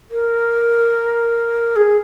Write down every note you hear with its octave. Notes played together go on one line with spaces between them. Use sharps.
A#4
G#4